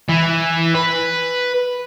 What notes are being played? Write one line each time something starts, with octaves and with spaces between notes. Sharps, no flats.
E3
B4